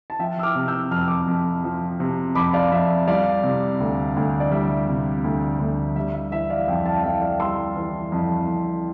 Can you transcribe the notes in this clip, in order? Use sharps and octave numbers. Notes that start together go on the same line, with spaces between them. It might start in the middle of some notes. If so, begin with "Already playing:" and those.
A5
F3 E5 G5
E6
D6 F6
C3
E6 G6
F2 F6
E6
D6 F6
F2
F3
C3
F2 B5 D6
D5 F5
F2 E5
G3 D5 F5
C3
D2
D2
D5
G3 E5
C3
D2
D2
G3 E5
E5
E3 E5
D5 F5
F2 E5 G5
F5 A5
F5
F2 E5 G5
D5 F5
G3 C6 E6
E3
F2
F2